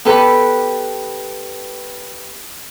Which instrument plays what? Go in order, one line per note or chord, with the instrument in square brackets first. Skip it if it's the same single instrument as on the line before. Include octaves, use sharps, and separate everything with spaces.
[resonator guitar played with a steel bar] B3 G4 A4 B4